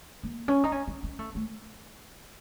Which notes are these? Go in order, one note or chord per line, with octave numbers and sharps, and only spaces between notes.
A#3
C#4
D#4
C#4
C#4
C#4
A3
A3